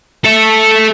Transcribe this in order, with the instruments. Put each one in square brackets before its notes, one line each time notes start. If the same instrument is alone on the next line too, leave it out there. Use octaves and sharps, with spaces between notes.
[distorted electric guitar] A4 E5